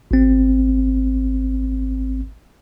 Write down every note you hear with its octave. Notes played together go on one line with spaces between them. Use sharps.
G#1 C4